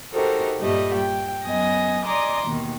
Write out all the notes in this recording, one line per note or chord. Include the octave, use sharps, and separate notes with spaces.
D#4 F#4 G4 A4 A#4 C5
G2 A#2 G3 A3 D#5
G5
F#2 B3 D#5 G#5 A#6
D5 D#5 G#5 A#5 C6 D6
D#2 B2 D#3